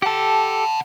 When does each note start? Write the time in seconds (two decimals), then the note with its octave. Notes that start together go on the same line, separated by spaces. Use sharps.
0.02 G4 A4 F#5 A5